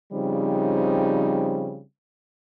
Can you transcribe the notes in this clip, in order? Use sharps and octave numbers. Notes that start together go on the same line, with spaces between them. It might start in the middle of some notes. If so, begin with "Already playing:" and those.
C#3 F3 G3 C4 D#4